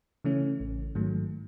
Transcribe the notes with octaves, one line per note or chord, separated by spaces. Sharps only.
C#3 E3 A3 C#4
A1
G#2 D#3 F#3 A3